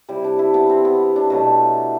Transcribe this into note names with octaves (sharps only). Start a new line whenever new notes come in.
C3 G3 E4
D4
E4
B3
C4
B3
D4
B2 F#3 A3